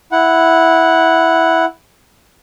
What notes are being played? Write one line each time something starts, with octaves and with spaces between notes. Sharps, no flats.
E4 F#5